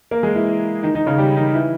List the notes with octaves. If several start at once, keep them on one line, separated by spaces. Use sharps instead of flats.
A#3 A#4
G#3 G#4
E3 E4
D#3 D#4
D#3 D#4
C#3 C#4
G3 G4
D#3 D#4
E3 E4